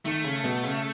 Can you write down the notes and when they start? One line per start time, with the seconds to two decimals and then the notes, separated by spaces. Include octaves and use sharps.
0.05 D#3 A3
0.24 C#3
0.44 B2
0.64 C#3